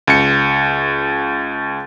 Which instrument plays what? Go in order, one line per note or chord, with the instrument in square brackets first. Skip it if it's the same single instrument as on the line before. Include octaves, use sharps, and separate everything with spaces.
[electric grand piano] C#2 C#7